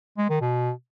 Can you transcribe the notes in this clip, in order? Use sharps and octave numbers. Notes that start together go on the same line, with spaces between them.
G#3
D#3
B2